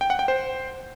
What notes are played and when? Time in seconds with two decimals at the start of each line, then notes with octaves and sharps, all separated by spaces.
0.01 G5
0.10 F#5
0.19 G5
0.28 C5